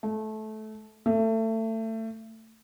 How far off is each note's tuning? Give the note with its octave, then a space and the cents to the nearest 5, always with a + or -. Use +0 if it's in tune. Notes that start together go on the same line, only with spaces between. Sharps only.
A3 -20
A3 +25